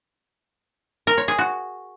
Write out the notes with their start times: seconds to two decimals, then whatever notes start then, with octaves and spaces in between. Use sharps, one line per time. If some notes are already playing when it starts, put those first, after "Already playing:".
1.07 A#4
1.18 C#5
1.28 G#4
1.38 F#4